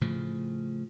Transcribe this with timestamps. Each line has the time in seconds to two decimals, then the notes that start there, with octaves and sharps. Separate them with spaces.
0.01 A2 C#3 F3